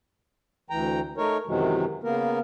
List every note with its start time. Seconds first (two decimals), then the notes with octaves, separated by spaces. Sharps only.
0.70 D2 E3 G5 A#5
1.18 A3 D#4 A#4 C#5
1.47 F#2 C3 D#3 E3 F#3 G#3
2.04 C#3 A#3 B3 A#4